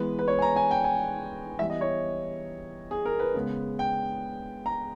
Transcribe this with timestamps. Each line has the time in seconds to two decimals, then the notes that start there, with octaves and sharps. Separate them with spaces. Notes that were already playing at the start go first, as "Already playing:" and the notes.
Already playing: E3 G#3 B3 B4
0.19 B4
0.28 C#5
0.39 G#5
0.42 A#5
0.56 G#5
0.71 G5
0.84 G#5
1.59 E3 G3 B3 E5
1.70 D#5
1.81 C#5
2.91 G#4
3.05 A#4
3.20 B4
3.34 C#3 G#3 B3
3.79 G5
4.66 A#5